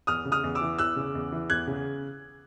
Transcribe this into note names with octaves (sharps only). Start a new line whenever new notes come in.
E2 D#6 F6
C#3
D#6 F6
E2
D6 E6
E3
E2 E6 F#6
C#3
E2
E3
E2 F#6 G#6
C#3